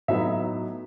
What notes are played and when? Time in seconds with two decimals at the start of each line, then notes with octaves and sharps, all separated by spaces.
0.08 A2 F#3 B3 D#4 E5